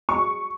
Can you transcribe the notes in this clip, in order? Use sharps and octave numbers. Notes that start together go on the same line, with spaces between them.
C#6